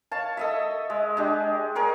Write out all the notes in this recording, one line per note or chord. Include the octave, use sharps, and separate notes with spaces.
C#5 F5 A5
A4 D#5 E5
G#3
G#3 D4 G4
G#4 A#4 C#5